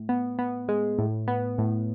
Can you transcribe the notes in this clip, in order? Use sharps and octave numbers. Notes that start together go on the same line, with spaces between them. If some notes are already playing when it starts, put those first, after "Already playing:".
Already playing: A2
B3
B3
G#3
A2
B3
A2